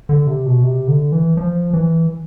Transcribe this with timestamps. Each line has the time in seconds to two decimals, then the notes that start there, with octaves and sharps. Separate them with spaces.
0.09 D3
0.27 C3
0.46 B2
0.63 C3
0.88 D3
1.12 E3
1.37 F3
1.73 E3